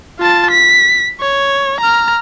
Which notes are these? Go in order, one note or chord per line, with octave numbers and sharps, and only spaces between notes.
F4 A5
B6
C#5
A#5 F6